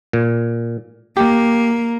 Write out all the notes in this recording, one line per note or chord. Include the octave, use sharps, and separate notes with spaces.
A#2
A#3 G4